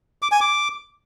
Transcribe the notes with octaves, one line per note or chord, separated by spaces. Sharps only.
D6
G#5
D6